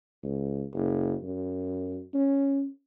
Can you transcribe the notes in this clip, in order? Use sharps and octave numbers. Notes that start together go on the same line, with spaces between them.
C#2
F#1
F#2
C#4